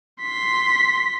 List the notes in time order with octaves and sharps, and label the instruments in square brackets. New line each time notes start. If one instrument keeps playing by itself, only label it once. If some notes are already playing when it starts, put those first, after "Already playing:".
[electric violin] C6 B6